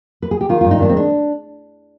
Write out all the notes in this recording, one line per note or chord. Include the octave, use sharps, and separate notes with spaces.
B4
G#4
G4
D#3 F4
G2 F4
D#4
D#3 D4
C4
G#3 D4